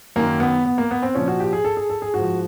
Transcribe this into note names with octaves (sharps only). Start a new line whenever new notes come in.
F#2 D#3 A#3
B3
B3
A#3
B3
C4
A#2 F3 C#4
F#4
G4
G#4
A4
G#4
A4
G#4
G#2 F3 F#4